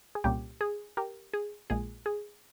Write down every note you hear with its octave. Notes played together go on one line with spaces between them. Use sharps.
G#4
C2 A#2 G3 A#3 C#4 G4
G#4
G4 A#4
G#4
A#1 A#2 G#3 G#4
G#4